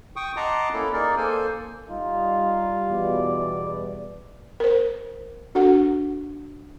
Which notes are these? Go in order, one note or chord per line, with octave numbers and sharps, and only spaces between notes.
G5 C#6 D#6
D#5 F#5 A5 A#5 C6 D6
A#3 C#4 E4 A4
A#3 D#4 G#4 A#4 D5
A#3 A4 C5 G#5
G3 D#4 F4
E2 B2 D5
A#4 C5
D4 F#4 A4 F#5